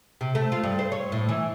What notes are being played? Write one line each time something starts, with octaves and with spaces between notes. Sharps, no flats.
C3
A3
F4
G2
C5
C#5
A2
E3